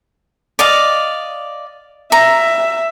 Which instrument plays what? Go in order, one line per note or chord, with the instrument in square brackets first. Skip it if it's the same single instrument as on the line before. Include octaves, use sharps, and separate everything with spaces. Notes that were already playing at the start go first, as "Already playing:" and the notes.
[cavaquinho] D5 D#5 F5
[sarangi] E5 [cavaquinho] A#5